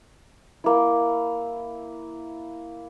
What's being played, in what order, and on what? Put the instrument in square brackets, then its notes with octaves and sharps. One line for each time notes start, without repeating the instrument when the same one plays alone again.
[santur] A#3 E4